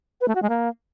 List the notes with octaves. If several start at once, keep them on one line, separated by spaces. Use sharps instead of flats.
B4
A3
F#4
G#3
A#3